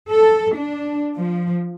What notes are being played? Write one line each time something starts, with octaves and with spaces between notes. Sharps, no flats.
A4
D4
F3